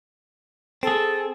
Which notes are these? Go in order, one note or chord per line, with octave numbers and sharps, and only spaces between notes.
C4 G#4 A4